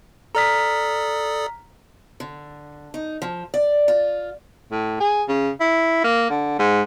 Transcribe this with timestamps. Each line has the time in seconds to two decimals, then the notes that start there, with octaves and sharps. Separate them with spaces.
0.35 A4 D5 A#5 D#6 F6 B6
2.20 D3
2.94 D#4
3.22 F3
3.54 D5
3.88 F4
4.72 A2
5.00 G#4
5.29 C#3
5.60 E4
6.04 A#3
6.30 D3
6.59 G#2